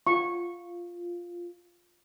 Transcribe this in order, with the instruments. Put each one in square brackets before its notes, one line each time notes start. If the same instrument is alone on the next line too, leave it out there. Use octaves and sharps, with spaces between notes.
[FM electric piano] F4 [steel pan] C#6